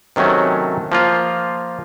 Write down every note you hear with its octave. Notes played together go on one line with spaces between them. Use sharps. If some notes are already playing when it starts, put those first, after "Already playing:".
C3 D#3 F#3 A3 C#4
F3 A#3 F4